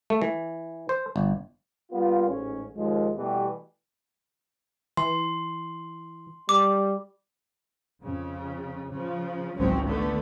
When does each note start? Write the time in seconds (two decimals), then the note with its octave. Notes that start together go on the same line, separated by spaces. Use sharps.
0.10 A3
0.22 E3
0.89 C5
1.16 G1
1.92 G3 A#3 B3 F4
2.29 A1 G#2 C#4
2.77 D#2 F3 G#3
3.16 B2 E3 G3 A3 B3 G4
4.97 E3 C6
6.49 G3 D6
8.01 F2 C#3
8.90 C#3 F3
9.57 G#1 C#2 F#3 C4 C#4
9.86 D3 A3 B3